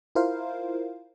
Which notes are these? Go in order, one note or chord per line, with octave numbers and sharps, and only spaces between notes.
E4 F4 A#4 C5 F5